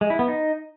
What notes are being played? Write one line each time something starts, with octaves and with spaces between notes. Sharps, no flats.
G#3
E4
B3
D#4